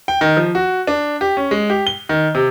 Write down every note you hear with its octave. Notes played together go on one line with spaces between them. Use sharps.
G5
D#3
F3
F#4
D4
G4
C#4
G#3
G4
G7
D#3
C3